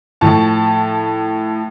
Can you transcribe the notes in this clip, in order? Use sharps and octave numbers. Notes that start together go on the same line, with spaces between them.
A2 F3 A5 C#6